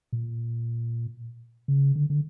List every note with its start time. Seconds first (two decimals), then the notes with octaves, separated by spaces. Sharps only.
0.13 A#2
1.68 C#3
1.95 D3
2.10 D3